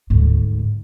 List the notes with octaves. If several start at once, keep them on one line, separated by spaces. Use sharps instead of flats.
D2 G#2